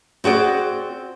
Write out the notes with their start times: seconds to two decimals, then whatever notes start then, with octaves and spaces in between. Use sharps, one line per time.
0.24 C4 F#4 G#4 D5